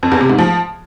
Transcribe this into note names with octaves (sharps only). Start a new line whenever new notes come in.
F2
E2
C3
G#2
F3